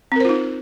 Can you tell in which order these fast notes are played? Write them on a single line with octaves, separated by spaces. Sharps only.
C4 A#4 C5 F4 D#4